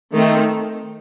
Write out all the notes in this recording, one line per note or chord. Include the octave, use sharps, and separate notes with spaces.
D#3 A3 C4